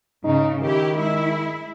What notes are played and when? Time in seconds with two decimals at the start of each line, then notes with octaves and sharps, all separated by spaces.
0.24 G#2 C#3 D#4
0.62 D#3 E4 G4
0.97 G#3 E4